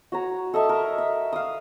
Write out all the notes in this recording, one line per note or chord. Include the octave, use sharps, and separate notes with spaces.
F#4 C#5 A#5
A4 D#5 E5 A5
A#4
E5
F5 D#6